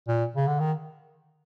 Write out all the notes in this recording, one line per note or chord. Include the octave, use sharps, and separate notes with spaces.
A#2
C#3
D3
D#3